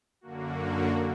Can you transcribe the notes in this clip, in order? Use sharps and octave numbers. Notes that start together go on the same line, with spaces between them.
F#2 D3 A#3 F#4